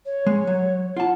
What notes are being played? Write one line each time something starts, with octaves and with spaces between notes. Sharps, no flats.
C#5
G#3
F#3
F4 F#5 A5